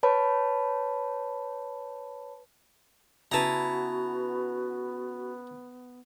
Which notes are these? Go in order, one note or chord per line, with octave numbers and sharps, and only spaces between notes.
B4 C#5 A5 B5
C#3 B3 E4 F#4 B4 A5 A#5